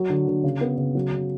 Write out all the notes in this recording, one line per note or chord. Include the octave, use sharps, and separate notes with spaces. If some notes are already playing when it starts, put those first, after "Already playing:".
Already playing: F#3
D3
D3
C#3
B3
C#3
F#3
C#3